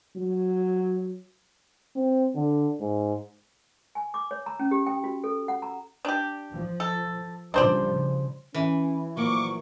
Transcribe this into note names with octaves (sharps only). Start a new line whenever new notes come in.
F#3
C4
D3
G#2
G#5
D6
C#5
A#5
C#4
G4
G5
F#4
A4
F#5
A#5
D4 G4
F3
A4
C#3 F3 G3 D4 C5 D5
C#3
E3 C#4
A#2 F3 F#3 A#3 F4 C#6 D6